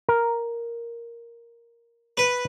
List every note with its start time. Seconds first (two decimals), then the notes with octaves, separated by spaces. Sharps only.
0.09 A#4
2.17 B4